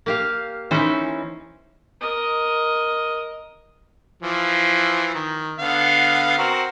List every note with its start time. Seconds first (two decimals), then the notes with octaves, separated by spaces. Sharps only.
0.06 A#3 G4 F5
0.71 E3 C#4 D#4 E4 C5
2.00 A#4 D#5
4.23 E3 F3
5.15 D#3
5.59 D3 B3 F5
6.38 C4 F#4 A#4